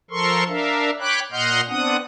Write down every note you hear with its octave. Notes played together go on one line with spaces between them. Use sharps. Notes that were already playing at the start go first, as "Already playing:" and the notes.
F3 A4 A#4 C6 C#6
D4 A#4 E5 F5
C#5 G5 B5 D6 F#6
A#2 D#5 F#5 C6 F6 G6
B3 C4 D4 F#5 D#6